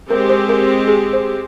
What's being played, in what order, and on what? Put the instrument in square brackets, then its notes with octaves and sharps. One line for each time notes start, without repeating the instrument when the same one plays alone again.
[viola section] G#3 C4 G4 [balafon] A#4
[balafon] C5
A#4
G#4
C5